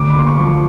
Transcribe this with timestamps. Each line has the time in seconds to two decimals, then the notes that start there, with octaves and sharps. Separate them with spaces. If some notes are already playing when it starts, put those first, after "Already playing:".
Already playing: D2 D3 D6
0.10 B5
0.16 A#3 C6
0.27 C#6
0.39 F3